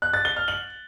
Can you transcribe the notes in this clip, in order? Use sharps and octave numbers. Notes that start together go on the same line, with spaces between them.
F#6
A6
G7
F6
F#7